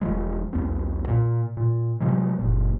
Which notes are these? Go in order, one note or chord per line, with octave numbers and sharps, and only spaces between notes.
E1 F3 G#3
B1 E2 A#3 C4
A#2
A#2
C3 F3 F#3 G#3
F#1 A#2